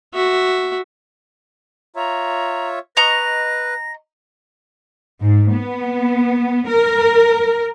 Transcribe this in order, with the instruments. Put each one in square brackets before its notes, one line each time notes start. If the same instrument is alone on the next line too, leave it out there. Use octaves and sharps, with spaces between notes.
[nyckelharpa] F#4 E5
[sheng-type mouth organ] F4 C#5 E5 [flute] A#5
[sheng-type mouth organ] B4 [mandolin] D#5 A#5 C#6 [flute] A#6
[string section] G#2
B3
A#4